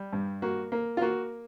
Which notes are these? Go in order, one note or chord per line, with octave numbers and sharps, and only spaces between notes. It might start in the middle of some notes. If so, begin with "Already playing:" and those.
Already playing: G3
G2
A#3 F#4
A#3
F4
A#3 F#4